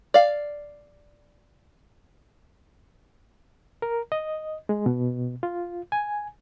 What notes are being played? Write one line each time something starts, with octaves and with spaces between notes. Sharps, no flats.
D5 F5
A#4
D#5
G#3
B2
F4
G#5